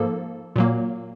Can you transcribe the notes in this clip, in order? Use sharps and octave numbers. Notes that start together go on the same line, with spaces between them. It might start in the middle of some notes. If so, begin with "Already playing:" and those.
Already playing: G#2 F3 A#3 A4
A#2 F#3 A#3